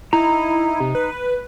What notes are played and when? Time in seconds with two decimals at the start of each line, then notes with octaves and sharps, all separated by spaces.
0.13 D#4 E4 A#5
0.80 C3
0.95 B4